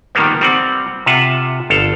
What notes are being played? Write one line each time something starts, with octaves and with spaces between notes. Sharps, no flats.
D#3 F3 G3 A#3 B3
G3 C4 F#5
C3 F4 E5 F#5 A5
G1 A4 F5